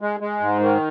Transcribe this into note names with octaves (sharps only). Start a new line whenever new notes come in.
G#3
G#3
G#2
D#3